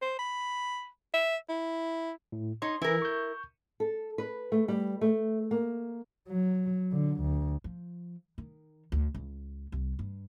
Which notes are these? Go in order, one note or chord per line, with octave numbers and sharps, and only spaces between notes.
C5
B5
E5
E4
A2
D#4 C#5 C6
E3 E4 A#4
C#6 G6
A4
B4
A3
G3
A3
A#3
F#3
D3
D2
F3
D#3
D2
C#2
C2
G2